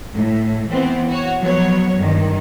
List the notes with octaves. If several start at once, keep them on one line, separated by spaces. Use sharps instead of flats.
A2
E3 B3 C4
F#4 C#5
F3 F#3 B3 C#5
G2 D#3